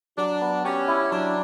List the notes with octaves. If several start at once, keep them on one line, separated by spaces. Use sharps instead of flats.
F#3 D4
B3
C#4 G4
E4
F#3 D4